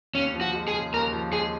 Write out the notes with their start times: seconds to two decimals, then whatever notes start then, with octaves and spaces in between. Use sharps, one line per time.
0.15 D#2 C#4
0.34 F3
0.41 F#4
0.55 G#3
0.68 G#4
0.74 C#3
0.93 D#2 A#4
1.13 F3
1.33 G#3 G#4